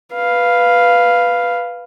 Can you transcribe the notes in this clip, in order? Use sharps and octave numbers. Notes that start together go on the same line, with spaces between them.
B4 F5